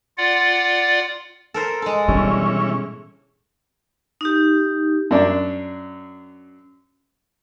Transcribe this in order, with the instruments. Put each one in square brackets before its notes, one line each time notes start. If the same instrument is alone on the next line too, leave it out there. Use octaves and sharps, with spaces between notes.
[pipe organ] F4 D5 F#5
[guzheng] A4 A#4 C5
G#3 A4
[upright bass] B2 [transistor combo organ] E3 C#4 [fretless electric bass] G3 D4
[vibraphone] D#4 G4
[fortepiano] F#2 D4